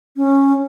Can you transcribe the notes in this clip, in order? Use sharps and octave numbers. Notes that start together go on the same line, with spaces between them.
C#4